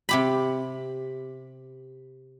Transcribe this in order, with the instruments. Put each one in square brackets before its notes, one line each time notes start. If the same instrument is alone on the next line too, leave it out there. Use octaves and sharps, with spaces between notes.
[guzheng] C3 G4 B5